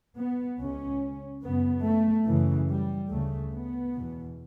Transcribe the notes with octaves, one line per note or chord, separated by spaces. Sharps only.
B3
C#2 C#3 C#4
F#2 C#3 B3
A3
F#2 C#3 E3
G3
D2 C#3 A3
B3
E2 B2